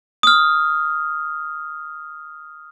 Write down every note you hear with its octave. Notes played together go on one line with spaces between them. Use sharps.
D#6 F6